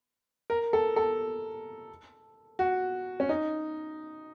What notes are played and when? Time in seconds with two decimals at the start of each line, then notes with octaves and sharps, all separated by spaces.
0.50 A#4
0.73 A4
0.96 A4
2.59 F#4
3.20 C#4
3.29 D#4